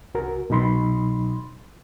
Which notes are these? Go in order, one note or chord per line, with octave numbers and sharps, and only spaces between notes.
C2 F#4 A#4
C2 B2 F#3 D#4 B5 C6